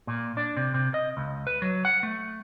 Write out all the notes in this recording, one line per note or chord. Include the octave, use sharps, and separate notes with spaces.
A#2
D4
C3
C3
D#5
C#2
B4
F#3
F#5
A3